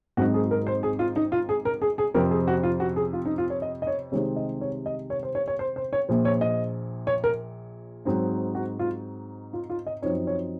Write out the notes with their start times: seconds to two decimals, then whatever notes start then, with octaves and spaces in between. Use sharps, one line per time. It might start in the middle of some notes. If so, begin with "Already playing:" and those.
0.17 G#1 G#2 F#3 C4 D#4 F#4
0.34 G#4
0.51 A#4
0.67 C5
0.83 G#4
0.99 F4
1.16 D#4
1.32 F4
1.49 G#4
1.65 A#4
1.82 G#4
1.98 G#4
2.14 F2 C3 F3 C4 A#4
2.31 G#4
2.47 F#4
2.63 F4
2.80 F#4
2.96 G#4
3.13 F4
3.26 D#4
3.38 F4
3.50 C#5
3.62 D#5
3.82 D#5
3.87 C#5
4.12 C2 C3 D#3 G#3 C4 C#5
4.36 D#5
4.61 C#5
4.86 D#5
5.10 C#5
5.23 C5
5.35 C#5
5.48 C#5
5.59 C5
5.76 C5
5.93 C#5
6.09 A#1 A#2 F3
6.25 C#5
6.41 D#5
7.07 C#5
7.24 A#4
8.05 G#2 F#3 C4 D#4
8.55 F#4
8.79 F4
9.53 F4
9.70 F4
9.86 D#5
10.02 F#2 F3 C4 D#4 C#5
10.27 C#5